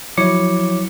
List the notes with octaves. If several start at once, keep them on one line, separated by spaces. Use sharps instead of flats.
F3 F#3 E4 C#5 D6 C#7